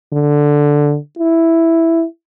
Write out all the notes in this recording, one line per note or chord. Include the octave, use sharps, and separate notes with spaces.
D3
E4